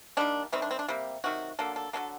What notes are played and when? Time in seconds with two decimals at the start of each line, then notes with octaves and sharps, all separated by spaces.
0.17 D#3 G3 A#3 D4
0.52 C3 D#3 G3 C4
0.62 D4
0.71 C4
0.79 D4
0.88 C3 G3 A#3
1.24 C3 D#3 F#3 F#4
1.59 D3 F#3 A#3 A4
1.76 A4
1.93 D3 F#3 A#3 A4